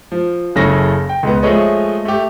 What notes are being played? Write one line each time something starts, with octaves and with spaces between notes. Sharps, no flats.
F3
F#1 C#3 A4 C#5 A#6
G5
C#2 B3
F3 G#3 A3 C#5 D#5
A3 G4